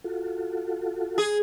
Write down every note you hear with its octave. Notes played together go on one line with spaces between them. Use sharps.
F4 F#4 A4
G#4